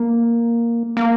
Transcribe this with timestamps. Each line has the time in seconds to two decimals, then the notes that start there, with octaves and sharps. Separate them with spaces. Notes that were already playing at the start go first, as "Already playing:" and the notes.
Already playing: A#3
0.97 A#3